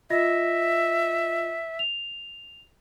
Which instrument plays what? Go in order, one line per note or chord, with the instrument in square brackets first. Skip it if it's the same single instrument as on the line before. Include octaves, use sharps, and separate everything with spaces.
[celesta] F4 D#5 A#6 [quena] E5
[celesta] F7